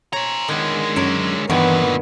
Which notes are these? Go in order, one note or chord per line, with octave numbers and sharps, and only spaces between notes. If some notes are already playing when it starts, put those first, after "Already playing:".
C5 C#5 A#5
D3 D#3 G#3 B3
F#2 A#4 C#5
D2 G2 A#2 D#3 E3 B3